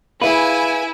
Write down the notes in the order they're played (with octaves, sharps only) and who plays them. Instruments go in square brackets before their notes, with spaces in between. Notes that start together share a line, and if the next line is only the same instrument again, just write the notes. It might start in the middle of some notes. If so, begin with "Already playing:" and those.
[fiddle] E4 [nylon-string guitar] G#4 E5 F5 [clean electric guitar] B4 [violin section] G#5